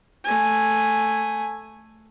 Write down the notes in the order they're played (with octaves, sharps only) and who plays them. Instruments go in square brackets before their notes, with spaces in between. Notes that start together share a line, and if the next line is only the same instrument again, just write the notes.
[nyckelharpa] A3 G#5